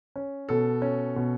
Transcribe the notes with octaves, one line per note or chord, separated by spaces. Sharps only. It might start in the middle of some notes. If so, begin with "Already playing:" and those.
C#4
B2 A4
C#4
B2